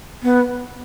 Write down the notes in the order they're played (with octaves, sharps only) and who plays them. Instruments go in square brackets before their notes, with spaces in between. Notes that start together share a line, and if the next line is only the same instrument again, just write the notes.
[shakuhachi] B3